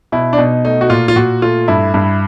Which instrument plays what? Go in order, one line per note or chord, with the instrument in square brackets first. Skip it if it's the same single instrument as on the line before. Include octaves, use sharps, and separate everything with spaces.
[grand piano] B2 E4
D4
B2 D#4
A3 D#4
F#4
A#2 F4
F4
A#2 F#4
A3 F4
G2 E4
G2 E4